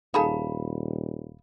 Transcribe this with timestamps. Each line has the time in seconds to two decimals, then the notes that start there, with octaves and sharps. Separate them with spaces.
0.14 D#1 D#4 G#4 A4 F5 A#5 B5